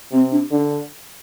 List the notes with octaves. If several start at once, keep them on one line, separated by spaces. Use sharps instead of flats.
C3 C4
D4
D3 D4